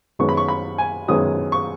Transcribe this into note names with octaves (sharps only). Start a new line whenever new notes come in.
F#2 D#3 G#3 B3 C#6
B5
C#6
B5
G#5
F#2 D#3 G#3 B3 D#6
C#6